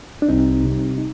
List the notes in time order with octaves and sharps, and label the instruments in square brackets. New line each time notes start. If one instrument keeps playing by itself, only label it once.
[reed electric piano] D4
[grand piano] C2 [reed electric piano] C4 D#4
[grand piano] C3 G3
[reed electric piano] D#4